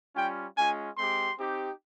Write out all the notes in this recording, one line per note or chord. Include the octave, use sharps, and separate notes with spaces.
G3 C#4 F4 G5
G#3 C#4 F4 G#5
G#3 C4 G4 C6
C4 D#4 G4